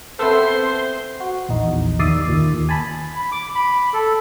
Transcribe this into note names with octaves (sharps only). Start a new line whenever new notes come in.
B3 C4 A4 B4 C5 E5 C6
F#4
A#1 E2 D#4
D#2 D5 E5 D#6 C7
D#2 A#2
G#5 A5 B5
B5
D6
B5
A4